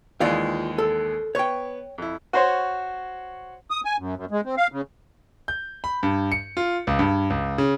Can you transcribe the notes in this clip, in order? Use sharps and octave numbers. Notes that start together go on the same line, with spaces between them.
D#2 E3 G#3 F4 D5 F5
A4
B3 C#5 G5 C#6
F2 E4
F#4 C5 C#5
D#6
G#5
F#2
F#2
G#3
C4
F5
C#3
G6
B5
G2
C#7
F4
C#2
G2
C#2
C#3